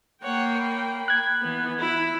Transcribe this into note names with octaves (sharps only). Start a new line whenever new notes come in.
A#3 C#5 F#5 G5
B5
F#6 G#6
E3 B3
E4 B5